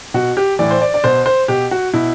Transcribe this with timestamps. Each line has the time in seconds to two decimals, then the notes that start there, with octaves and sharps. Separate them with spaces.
0.14 B2 F#4
0.37 G4
0.59 A2 E3 D5
0.71 C5
0.82 D5
0.94 D5
1.04 B2 C5
1.26 C5
1.48 B2 G4
1.71 F#4
1.93 B2 E4